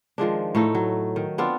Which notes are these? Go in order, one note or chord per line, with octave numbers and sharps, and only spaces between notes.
D#3 F3 G#3 D4
A2 A3 D#4
F#3
D#3
B3 C4 D4 F4